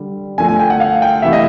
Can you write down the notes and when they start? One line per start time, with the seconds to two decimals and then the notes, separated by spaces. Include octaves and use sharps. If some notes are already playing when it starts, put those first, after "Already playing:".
Already playing: D3 G3
0.38 D3 F3 A3 G#5
0.48 G#5
0.59 G5
0.70 F#5
0.80 F5
1.02 G5
1.22 C3 E3 A3 E5
1.33 D#5